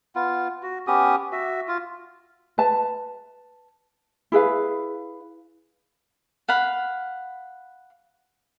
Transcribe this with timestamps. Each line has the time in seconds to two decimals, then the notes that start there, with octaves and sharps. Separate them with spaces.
0.15 B3 F4
0.63 F#4
0.87 B3 C#4 G4 D#6
1.32 F#4 E5
1.68 F4
2.58 B4 A5
4.32 E4 G#4 B4 F5
6.48 F5 F#5 B5